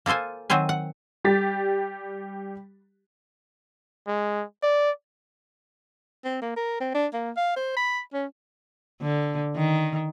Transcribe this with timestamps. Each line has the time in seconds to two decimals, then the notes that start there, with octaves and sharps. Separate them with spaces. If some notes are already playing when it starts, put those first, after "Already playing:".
0.06 A#3 F4 A4 C5 G#5
0.50 D#3 F#3 C4 C5 G#5
0.69 F#5
1.24 G3 G4 A6 B6
4.07 G#3
4.63 D5
6.25 C4
6.42 A#3
6.56 A#4
6.81 C4
6.95 D4
7.13 A#3
7.37 F5
7.56 C5
7.77 B5
8.13 C#4
9.02 D3
9.56 D#3